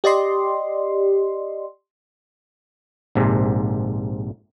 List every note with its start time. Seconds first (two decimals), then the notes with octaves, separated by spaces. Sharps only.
0.04 G4 D5 D#5 C6
3.15 A#1 G#2 C3